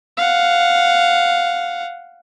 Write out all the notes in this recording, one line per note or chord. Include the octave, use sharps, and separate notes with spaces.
F5 F#5